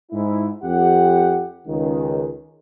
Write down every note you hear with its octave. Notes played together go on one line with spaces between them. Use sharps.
G#2 E4
F2 G4 F#5
C#2 D#3